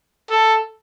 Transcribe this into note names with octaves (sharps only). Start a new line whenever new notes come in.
A4